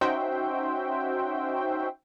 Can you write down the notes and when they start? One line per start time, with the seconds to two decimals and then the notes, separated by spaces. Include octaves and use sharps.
0.01 C#4 D#4 F#4 C5 E5 G5